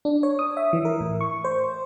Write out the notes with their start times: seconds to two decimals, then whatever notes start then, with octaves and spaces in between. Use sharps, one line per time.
0.05 D4
0.23 C#5
0.39 D#6
0.57 E5
0.73 E3
0.85 A#4
1.01 A2
1.21 C#6
1.44 C5